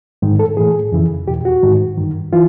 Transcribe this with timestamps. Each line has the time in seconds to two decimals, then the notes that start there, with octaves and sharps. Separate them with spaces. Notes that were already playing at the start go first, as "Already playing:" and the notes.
0.22 G#2 D#3
0.39 A4
0.57 A2 E3 G#4
0.92 F2 C#3 E3
1.28 E2 B2 G4
1.45 F#4
1.63 G#2 D#3
1.98 G2 D#3
2.33 E3 F4